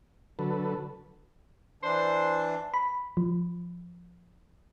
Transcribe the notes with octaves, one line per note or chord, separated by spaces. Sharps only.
D3 F#3 A4 B4
E3 D4 C5
B5
F3